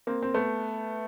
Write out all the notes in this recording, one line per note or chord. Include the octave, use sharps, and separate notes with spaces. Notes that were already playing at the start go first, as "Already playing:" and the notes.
A#3 C4
C4
A3 B3